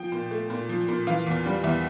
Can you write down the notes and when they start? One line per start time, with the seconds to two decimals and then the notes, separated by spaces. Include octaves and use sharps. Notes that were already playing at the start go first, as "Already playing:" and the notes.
Already playing: F3 G5
0.12 A#2
0.31 A3
0.50 A#2
0.69 F3
0.88 A#2
1.07 E3 F5
1.27 E2
1.45 G3
1.64 E2 E5